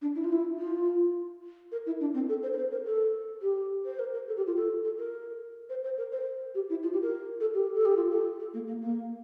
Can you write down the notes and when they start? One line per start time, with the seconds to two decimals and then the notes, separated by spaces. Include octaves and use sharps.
0.02 D4
0.15 E4
0.24 F4
0.32 E4
0.58 F4
1.72 A#4
1.86 E4
2.01 D4
2.14 C4
2.29 A4
2.43 C5
2.53 A#4
2.57 C5
2.71 A#4
2.86 A4
3.42 G4
3.86 C5
3.99 A#4
4.13 A#4
4.28 A4
4.37 G4
4.47 F4
4.57 A4
4.84 A4
4.98 A#4
5.70 C5
5.84 C5
5.98 A#4
6.12 C5
6.55 G4
6.70 E4
6.83 F4
6.93 G4
7.02 A#4
7.40 A4
7.54 G4
7.75 A4
7.85 G4
7.96 F4
8.11 A4
8.40 A4
8.54 A#3
8.68 A#3
8.82 A#3